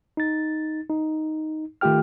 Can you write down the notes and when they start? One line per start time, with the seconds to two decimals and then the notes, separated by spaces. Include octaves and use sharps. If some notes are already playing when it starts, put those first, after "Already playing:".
0.17 D#4 A6
0.90 D#4
1.81 D#3 A3 F4 G4 G5 F6